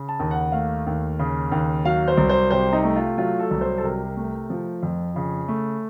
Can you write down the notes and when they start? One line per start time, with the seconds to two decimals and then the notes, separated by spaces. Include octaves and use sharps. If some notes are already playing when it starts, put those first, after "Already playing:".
Already playing: C#3
0.09 A5
0.19 D#2
0.31 F#5
0.52 A3 F5
0.86 D#2
1.19 C#3
1.51 D#2
1.85 F#3 F5
2.08 C5
2.17 C2
2.29 C5
2.51 C3 C5
2.73 D#4
2.84 A3
2.96 F4
3.18 F#3 F4
3.39 A4
3.51 C2
3.61 C5
3.78 A4
3.83 C3 A#4
4.17 A3
4.50 F3
4.83 F2
5.16 C#3
5.48 A3